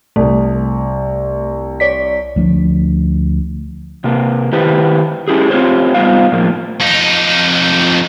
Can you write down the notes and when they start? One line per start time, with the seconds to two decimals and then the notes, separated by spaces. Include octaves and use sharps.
0.16 C2 A3
1.80 C#5 D5 B6
2.36 D2 F3 D4
4.04 C3 A#3
4.52 D#3 E4 G4 B4 C5
5.28 C#4 E4 G4 G#4
5.50 C4 F4 G4 C5 C#5
5.94 G3 B3 D#4 F4 C5 F5
6.32 A2 F3 A#3
6.80 F2 D#4